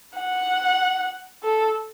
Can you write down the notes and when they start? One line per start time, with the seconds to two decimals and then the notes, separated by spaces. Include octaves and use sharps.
0.17 F#5
1.43 A4